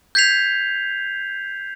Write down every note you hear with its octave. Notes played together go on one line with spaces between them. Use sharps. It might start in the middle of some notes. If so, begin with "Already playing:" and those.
G6 G#6 B6 C7 F7